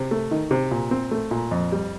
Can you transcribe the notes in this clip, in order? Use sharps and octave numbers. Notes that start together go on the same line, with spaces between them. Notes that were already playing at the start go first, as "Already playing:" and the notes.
Already playing: C3
A3
D#3
C3
A#2
C4
A3
A#2
F2
G3